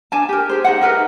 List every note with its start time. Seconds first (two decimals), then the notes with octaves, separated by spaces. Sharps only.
0.12 D4 G#5 A5
0.29 G4 A#4
0.49 G4 G#4 C5
0.64 D#4 F4 C5 F#5
0.81 D#4 A#4 B4 D#5